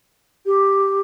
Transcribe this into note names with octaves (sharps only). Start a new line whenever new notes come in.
G4